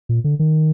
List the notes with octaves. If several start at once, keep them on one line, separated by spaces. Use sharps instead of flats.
A#2
D3
D#3